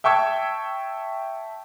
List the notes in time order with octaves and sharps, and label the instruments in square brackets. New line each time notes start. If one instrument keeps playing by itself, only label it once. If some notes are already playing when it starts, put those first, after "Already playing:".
[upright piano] E5 G5 A5 C#6 E6 G#6